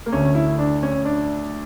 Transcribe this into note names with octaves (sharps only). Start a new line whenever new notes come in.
A#3
D2 D3 A3 C#4
E4
D4
C#4
D4